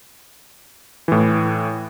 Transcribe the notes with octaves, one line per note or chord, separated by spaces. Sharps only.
A2 E3